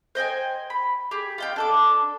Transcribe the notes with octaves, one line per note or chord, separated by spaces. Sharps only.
C5 D#5 G5 G#5
B5
G4 G#4
F4 D#5 G5
D4 A4 D6